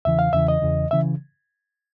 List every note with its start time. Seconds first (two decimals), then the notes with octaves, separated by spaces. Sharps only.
0.05 E2 C#3 E3 E5
0.19 F5
0.33 E2 C#3 E3 E5
0.48 D#5
0.62 E2 C#3 E3
0.91 C#3 E3 E5